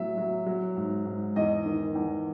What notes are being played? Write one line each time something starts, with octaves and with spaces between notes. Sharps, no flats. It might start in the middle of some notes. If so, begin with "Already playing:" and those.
Already playing: A2 F#3 E5
F#3
F#3
G#2
G#2
E2 D#5
D#3
E2